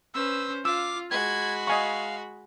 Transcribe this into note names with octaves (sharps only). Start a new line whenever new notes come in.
C#4 B4 C5 E6
F4 F5 D6 E6
G#3 F#4 B5 G#6
D#5 F5 G#5 C#6